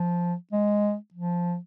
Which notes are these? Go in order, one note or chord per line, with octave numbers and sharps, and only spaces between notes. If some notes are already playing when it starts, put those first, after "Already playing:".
Already playing: F3
G#3
F3